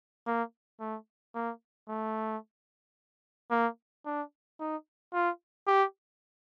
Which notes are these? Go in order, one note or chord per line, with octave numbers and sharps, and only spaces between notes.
A#3
A3
A#3
A3
A#3
D4
D#4
F4
G4